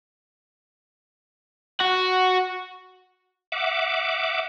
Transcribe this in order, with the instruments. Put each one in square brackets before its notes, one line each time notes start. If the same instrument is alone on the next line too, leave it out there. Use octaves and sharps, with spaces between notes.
[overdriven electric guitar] F#4
[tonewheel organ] E5 F#5 D6